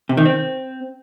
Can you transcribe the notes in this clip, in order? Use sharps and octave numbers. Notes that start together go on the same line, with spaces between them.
C3
D#3
C4